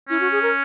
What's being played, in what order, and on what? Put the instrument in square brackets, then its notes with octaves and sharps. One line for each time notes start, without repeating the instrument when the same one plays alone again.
[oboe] C#4 [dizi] E4
[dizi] F#4
G#4
A#4